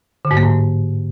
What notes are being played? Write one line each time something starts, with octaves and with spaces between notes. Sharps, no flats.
D3
G#2
A#3
A2